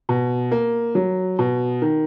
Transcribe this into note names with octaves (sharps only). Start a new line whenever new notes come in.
B2
A#3
F#3
B2
D#3